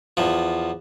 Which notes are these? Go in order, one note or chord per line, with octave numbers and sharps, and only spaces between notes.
E2 F3